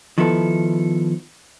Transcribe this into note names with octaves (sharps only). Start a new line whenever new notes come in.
D#3 F3 B3 E4 A4